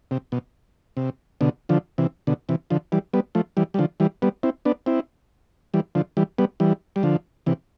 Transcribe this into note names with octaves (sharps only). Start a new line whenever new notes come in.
C3
B2
C3
B2 D3
D3 F3
C3 E3
B2 D3
C3 E3
D3 F3
E3 G3
G3 B3
F3 A3
E3 G3
G3
D3 F3
E3 G3
G3 B3
C4 E4
B3 D4
C4 E4
E3 G3
D3 F3
E3 G3
G3 B3
E3 G3
G3
D3 F3
C3 E3